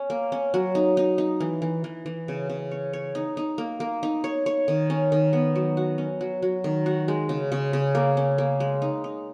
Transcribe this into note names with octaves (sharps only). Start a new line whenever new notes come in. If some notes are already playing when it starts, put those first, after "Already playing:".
Already playing: C#4
A#3
C#4
F#3
D#4
D#4
D#4
E3
E3
E3
E3
C#3
C#3
C#5
C#5
D#4
D#4
A#3
A#3
D#4
C#5
C#5
D#3
C#4
D#3
B3
F#3
F#4
C#4
F#3
F#3
D#3
F#4
G#3
C#3
C#3
C#3
A#3
C#4
A#3
G#3
D#4
D#4